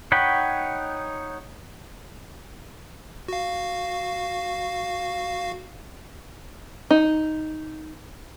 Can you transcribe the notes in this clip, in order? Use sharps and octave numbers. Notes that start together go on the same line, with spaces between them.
D#4 C#5 F#5 G5 B5
F#4 F5
D#4